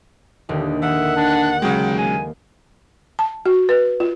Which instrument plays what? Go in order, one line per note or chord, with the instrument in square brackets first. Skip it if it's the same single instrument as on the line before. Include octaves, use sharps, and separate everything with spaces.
[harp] D#1 D#2 D3
[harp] D#3 [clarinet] E5 [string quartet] F#5
[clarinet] D4
[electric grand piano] C#3 F#3 G#3 [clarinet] G5
[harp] A#3 [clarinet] G#5
[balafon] A5
F#4
B4
F4